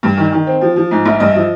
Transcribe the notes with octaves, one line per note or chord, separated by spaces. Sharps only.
G2
D#3
D#3
C4
F3
F3
G#2
A#1
G2 D#5
F3